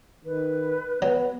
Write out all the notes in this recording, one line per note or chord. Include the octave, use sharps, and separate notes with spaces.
D#3 B4
F#3 B3